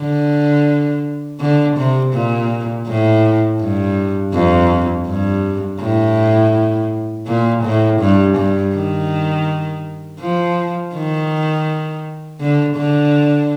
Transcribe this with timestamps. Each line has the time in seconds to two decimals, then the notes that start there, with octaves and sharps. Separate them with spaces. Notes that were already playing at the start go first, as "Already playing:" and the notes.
Already playing: D3
1.40 D3
1.77 C3
2.14 A#2
2.87 A2
3.60 G2
4.34 F2
5.07 G2
5.80 A2
7.27 A#2
7.64 A2
8.00 G2
8.36 G2
8.74 D#3
10.21 F3
10.94 D#3
12.41 D3
12.76 D3